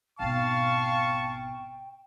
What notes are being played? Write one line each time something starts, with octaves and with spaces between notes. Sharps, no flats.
G#1 B2 F5 G5 A5 C#6